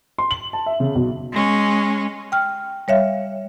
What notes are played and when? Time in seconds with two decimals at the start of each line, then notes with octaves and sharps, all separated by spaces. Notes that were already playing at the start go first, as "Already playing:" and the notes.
0.18 C6
0.31 F#7
0.53 A5
0.66 E5
0.80 C#3
0.95 B1
1.32 G#3 C#4
2.32 G5 F6
2.88 G3 C#5 E5 F5